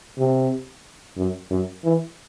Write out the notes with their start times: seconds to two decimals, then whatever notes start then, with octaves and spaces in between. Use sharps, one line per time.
0.19 C3
1.17 F#2
1.51 F#2
1.84 E3